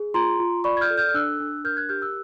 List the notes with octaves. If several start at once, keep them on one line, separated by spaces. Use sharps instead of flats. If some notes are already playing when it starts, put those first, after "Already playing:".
Already playing: G#4
F4 A#5 C6
F4
D5 B5 C#6
G#6
F6 G6
A4
F6 G6
F6
D4 E6 F#6
D4
A#4 F6 G6
F#6 G#6
G4 F6 G6
E6 F#6